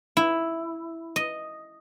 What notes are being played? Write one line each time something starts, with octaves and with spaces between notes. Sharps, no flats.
E4
D#5